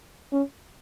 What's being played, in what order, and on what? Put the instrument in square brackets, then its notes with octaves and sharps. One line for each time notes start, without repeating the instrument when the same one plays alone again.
[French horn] C#4